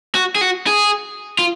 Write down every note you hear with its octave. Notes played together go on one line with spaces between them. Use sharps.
F#4
G#4
F#4
G#4
F4